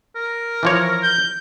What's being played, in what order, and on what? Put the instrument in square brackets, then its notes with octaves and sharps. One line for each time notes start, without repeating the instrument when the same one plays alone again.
[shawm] A#4
[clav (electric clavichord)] E3 F3 C#5
[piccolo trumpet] G6